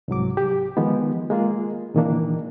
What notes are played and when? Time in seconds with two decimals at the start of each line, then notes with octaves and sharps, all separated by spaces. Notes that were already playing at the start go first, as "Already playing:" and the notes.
0.08 C2 G#2 F#3 D6
0.37 G4
0.77 D#3 F3 G#3 B3
1.30 G#3 A#3 F4 G#4
1.94 A#2 D#3 E3 A#3 D4